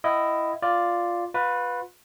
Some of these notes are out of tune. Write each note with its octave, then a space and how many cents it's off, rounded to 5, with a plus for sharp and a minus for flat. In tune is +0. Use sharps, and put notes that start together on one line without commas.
E4 +10 D#5 +0 F#5 +35
F4 +0 D5 +0
F4 +40 B4 +0